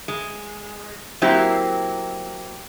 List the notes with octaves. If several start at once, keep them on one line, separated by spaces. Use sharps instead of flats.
G#3
F#3 A#3 C4 E4 G4